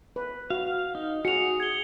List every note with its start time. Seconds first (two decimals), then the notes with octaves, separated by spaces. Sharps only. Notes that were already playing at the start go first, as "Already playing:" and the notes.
0.16 B4
0.50 F#4 F5
0.95 D#4
1.25 F#4 G#4 C#7 F7
1.60 G#6 G7